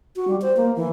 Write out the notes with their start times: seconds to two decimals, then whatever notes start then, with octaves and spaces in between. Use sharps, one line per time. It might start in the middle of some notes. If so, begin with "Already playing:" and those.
0.16 F#4
0.28 G3
0.42 C5
0.57 A#3
0.76 E3